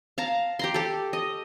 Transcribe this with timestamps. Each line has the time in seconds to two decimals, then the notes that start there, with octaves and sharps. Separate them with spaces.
0.18 F5 A5 A#5
0.59 G4 A#5 C6
0.74 G4 A4
1.13 D#5